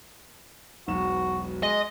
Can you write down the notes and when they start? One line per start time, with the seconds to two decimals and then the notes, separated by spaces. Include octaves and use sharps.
0.88 E1 B1 F#4 E7
1.63 G#3 D#5